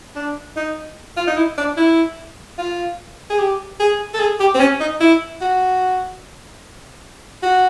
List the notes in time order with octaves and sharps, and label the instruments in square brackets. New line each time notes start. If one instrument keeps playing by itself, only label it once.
[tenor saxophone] D4
D#4
F4
D#4
E4
D4
E4
F4
G#4
G4
G#4
A4
G#4
G4
C4
C#4
D#4
E4
F#4
F#4